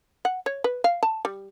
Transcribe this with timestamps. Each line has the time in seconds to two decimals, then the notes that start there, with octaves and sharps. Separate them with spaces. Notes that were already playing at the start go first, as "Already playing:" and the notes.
0.25 F#5
0.46 C#5
0.64 B4
0.84 F5
1.03 A5
1.25 G3